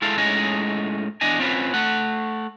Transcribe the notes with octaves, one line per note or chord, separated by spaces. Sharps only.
G#3 E4 A4 F5
A2 G#3 C#4 D#4 D#5 G#5
E2 D4 D#5 G#5
C4 C#4 F4 A4 B4
A3 F#5